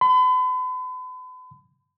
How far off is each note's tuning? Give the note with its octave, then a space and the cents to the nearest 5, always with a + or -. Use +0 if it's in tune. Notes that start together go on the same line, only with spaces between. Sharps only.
B5 +40